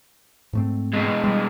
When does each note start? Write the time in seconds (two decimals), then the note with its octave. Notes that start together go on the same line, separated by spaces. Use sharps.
0.53 G#2 A3 C4
0.93 B2 G#3
1.24 G3